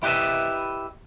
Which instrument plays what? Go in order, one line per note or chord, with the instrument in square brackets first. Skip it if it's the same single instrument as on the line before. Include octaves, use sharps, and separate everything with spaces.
[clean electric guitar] E4 G4 B4 D#5 E5